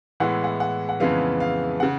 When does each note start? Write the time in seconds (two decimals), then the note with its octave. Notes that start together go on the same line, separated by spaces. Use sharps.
0.20 A2 E3 G#3 B3 F#5
0.44 F#5
0.60 F#5
0.89 F#5
1.00 F2 C#3 E3 G#3 B3 F5
1.40 F5
1.80 C#3 F#5